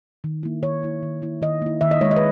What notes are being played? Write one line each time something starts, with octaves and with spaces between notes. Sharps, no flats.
D#3
A#3 E4
D#3 C#5
A#3 E4
D#3
A#3 E4
D#3 D#5
A#3 E4
D#3 E5
D#5
G#3 D#4 C#5
D#5
B4